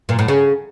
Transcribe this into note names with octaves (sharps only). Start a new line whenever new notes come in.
A#2
A2
C#3